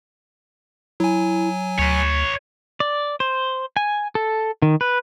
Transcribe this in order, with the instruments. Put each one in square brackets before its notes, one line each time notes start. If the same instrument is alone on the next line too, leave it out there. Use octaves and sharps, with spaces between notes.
[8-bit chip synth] F#3 G#5 [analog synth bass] E4
[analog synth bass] D2 [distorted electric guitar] B4 C#5
[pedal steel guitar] D5
C5
G#5
A4
D#3
B4